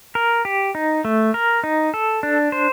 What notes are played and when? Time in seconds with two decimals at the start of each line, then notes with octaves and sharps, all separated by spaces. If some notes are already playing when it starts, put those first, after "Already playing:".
0.15 A#4
0.45 G4
0.75 D#4
1.05 A3
1.34 A#4
1.64 D#4
1.94 A4
2.23 D4
2.52 C5